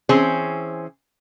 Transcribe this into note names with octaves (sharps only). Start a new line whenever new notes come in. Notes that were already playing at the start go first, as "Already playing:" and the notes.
E3 C4 C#4 G#4 C5